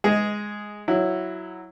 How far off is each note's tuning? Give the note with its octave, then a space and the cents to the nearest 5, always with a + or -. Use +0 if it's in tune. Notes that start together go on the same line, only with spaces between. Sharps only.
G#3 +0 G#4 +0 D#5 +20
F#3 +0 E4 +0